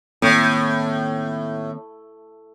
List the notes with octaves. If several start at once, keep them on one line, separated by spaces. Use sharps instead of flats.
A2 D#3 A#3 C4